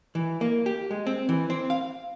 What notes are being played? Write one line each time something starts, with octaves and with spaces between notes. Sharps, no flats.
E3
A#3
G4
G#3
C4
E3
C4
F5